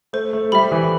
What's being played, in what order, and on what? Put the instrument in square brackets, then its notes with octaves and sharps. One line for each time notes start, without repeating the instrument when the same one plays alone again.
[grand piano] A3 [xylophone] C5
[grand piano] A3
[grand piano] G3 [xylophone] E5 B5
[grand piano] E3